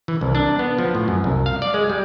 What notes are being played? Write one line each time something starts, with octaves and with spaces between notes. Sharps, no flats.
E3
C2
D4
B3
F3
A2
F#2
C2
F5
D5
G#3
G3